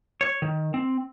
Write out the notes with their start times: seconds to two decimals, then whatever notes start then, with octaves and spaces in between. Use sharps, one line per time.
0.21 C#5
0.42 D#3
0.74 C4